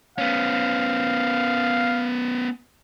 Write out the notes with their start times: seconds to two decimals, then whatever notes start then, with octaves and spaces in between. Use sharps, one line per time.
0.18 B3 C#4 F5